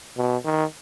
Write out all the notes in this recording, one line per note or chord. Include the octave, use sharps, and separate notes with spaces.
B2
D#3